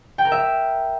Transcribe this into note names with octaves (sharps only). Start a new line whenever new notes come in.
G5
A#4
E5